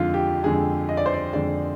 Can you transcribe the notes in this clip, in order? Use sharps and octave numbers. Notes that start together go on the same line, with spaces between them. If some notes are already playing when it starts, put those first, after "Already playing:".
Already playing: F2 D3 G#3 F4
G4
F2 D3 G#3 G#4
D#5
D5
C5
D5
F2 D3 G#3 D5